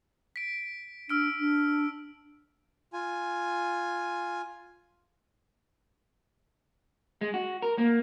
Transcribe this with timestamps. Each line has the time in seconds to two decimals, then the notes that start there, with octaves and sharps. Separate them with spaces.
0.36 B6 D7
1.10 D4 E6 F6 D7
1.39 D4
2.93 F4 G#5
7.21 G#3
7.34 F#4
7.62 A#4
7.78 A#3